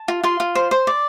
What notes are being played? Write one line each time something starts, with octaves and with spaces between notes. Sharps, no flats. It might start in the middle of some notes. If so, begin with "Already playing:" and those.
Already playing: A5
F4
F4 C6
F4
C5
C5
D5